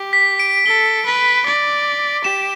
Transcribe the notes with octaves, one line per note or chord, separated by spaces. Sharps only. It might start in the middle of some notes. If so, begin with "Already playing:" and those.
Already playing: G4
B6
D7
A4 G7
B4
D5
G4 E7